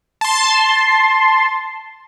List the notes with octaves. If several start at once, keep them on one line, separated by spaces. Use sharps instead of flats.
A5 C6